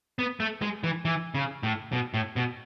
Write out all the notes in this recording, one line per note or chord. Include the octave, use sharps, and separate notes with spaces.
B3
A3
G#3
E3
E3
C#3
A2
B2
A2
B2